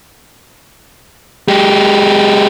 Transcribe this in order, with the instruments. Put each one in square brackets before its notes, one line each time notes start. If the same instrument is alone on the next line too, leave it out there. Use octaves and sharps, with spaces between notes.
[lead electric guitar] G#3 G4